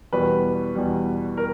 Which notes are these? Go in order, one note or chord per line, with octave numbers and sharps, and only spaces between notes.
E2 B2 G3 B4
E2 B2 G3
A#4